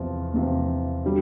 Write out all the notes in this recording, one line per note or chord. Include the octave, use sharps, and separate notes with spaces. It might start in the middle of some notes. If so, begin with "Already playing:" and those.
Already playing: E2 C3 F3
E2 C3 F3
D3 G3